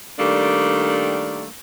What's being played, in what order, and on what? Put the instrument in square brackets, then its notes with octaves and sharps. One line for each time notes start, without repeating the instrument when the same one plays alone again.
[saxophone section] D#3 G3 A3 A#3 D4